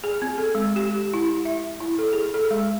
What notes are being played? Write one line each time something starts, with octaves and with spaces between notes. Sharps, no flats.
G#4
C4
A4
G#3
G4
E4
E5
E4
A4
G#4
A4
G#3